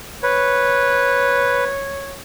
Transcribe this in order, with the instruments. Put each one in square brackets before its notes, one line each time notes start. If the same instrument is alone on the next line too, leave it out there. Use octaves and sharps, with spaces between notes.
[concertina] B4 [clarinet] C#5